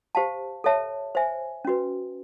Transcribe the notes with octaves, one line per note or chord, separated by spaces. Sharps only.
G4 C5 F5 A5
A4 C#5 E5 A5
C5 E5 G#5
C#4 F#4 B4